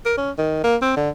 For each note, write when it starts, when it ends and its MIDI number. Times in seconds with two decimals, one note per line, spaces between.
0.06 0.13 70
0.17 0.31 61
0.38 0.62 51
0.64 0.76 58
0.82 0.93 60
0.97 1.10 50